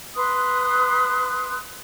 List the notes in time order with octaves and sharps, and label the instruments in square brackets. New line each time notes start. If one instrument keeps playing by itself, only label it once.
[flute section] B4 C6 D#6 F#6